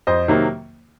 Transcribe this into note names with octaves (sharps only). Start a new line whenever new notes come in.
F2 C5 D#5
C3 D#3 F#3 A#3